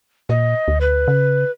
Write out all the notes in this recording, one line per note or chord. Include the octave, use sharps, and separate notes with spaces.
A#2 D#5
D2
B4
C#3